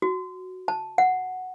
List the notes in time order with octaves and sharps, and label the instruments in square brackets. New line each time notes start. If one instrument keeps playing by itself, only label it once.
[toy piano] F#4
A5
F#5